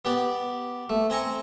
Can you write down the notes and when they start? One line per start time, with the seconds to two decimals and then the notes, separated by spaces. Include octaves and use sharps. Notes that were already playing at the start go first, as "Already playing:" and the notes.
0.05 B3 G4 D5
0.90 A3
1.10 C4 G#5 A#5 C#6